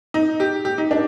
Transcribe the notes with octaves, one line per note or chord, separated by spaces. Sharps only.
D#4
G4
G4
D#4
D4